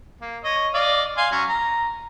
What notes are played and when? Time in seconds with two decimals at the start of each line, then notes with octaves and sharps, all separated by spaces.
0.21 A#3
0.44 C#5 D#5
0.74 D5 D#5 F5
1.17 F5 G#5 C6
1.32 F#3 C#4
1.49 A#5